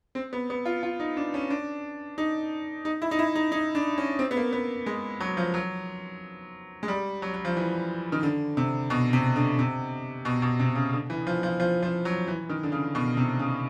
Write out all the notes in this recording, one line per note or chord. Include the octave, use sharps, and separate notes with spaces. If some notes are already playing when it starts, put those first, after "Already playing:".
C4
B3
B3
F4
F4
D#4
D4
C#4
D4
D#4
D#4
E4
D#4
E4
D#4
D#4
D4
C#4
C4
B3
A#3
B3
G#3
F#3
F3
F#3
G#3
G3
F#3
F#3
F3
E3
D#3
D3
C3
B2
C3
D3
C3
B2
B2
C3
C#3
D3
E3
F3
F3
F3
F3
F#3
E3
D#3
D3
C#3
B2
C3
C#3